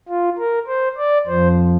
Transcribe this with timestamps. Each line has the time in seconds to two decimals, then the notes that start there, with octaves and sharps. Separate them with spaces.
0.08 F4
0.38 A#4
0.68 C5
0.98 D5
1.27 F2 F3 C5